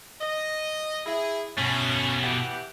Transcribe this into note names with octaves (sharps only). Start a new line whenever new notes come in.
D#5
E4 G#4
B2 A3 C#4
E3 G4 F#5